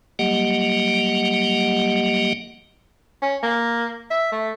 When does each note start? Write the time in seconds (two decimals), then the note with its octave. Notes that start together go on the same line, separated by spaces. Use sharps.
0.19 F#3 G3 A#3 G4 D#5 F#5
3.22 C#4
3.43 A#3
4.10 E5
4.32 A3